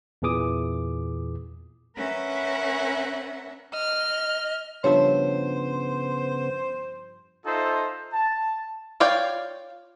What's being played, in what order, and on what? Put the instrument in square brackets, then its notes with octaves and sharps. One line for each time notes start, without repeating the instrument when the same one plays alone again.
[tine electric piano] E2 A#2 E3 G#4 D6 D#6
[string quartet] C#4 A#4 B4 E5 F#5
[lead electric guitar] D#5 [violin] F6
[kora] G2 F3 E5 [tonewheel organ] C#3 B3 [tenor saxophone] C5 [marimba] C#5
[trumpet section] D#4 F4 A4 C5 E5
A5
[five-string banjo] F4 C#5 D5 F5 G5